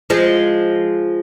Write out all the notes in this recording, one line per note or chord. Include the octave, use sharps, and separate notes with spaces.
F3 G#3